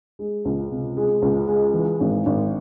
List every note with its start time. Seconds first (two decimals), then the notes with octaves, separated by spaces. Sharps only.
0.19 G#3
0.45 C#2
0.72 C3
0.97 G#3
1.22 C#2
1.48 G#3
1.74 E3
2.00 G#1
2.26 G#1